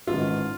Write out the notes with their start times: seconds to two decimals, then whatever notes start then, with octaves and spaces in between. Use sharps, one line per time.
0.07 A1 G#2 D#3 F4